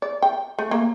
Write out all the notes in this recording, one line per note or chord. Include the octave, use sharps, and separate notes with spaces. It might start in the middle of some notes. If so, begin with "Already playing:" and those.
D5
G5
A3
A#3